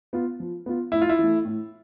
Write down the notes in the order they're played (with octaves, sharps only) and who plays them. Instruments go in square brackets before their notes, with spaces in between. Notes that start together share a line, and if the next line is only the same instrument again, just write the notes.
[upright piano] B3 F4
F3
B3 F4
[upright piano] A2 [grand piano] E4
[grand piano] F4
E4
[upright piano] E3 A3
A2